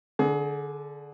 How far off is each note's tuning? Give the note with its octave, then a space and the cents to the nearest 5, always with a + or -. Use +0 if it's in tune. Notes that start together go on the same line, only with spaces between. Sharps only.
D3 +0 G#4 +30